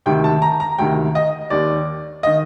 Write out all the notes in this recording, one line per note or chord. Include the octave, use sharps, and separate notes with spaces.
D2 C3 D#3 G5
A5
A#5
A#5
D2 C3 D#3 G5
D#5
D#2 D#3 D5
D#3 D#5